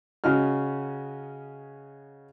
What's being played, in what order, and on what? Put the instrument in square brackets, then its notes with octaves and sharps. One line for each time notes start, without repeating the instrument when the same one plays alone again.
[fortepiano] C#3 C#4 F#4 D#5 F6